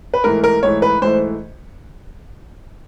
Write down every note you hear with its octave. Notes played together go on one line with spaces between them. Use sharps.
B4
G#2 E3 A3 A#4
A#4
G#2 E3 A3 C#5
B4
G#2 E3 A3 C5